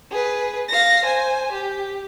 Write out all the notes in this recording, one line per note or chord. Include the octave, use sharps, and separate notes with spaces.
G#4 B4
F5 A#6
C5 G#5
G4